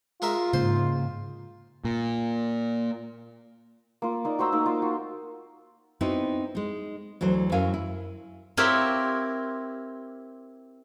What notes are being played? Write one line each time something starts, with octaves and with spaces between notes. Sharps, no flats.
G#3 F4 A#4 E5
G#2 C#3 A#3 C5
A#2
A#3 F4
A#3 D#4 D5
F#4 C5 A#5 E6
A#3 D#4 F5
F4
F#4
B3 C4 D#4 E4 F#4
G#3 D#4
D2 E3 F#3 C5
F#2 F#3 E4 A#4 F5 G#5
E4
C4 E4 F4 G4 A#4 C#5